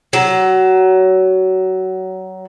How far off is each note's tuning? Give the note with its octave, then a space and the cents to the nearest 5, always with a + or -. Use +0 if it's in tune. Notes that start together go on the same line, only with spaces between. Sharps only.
F#3 +20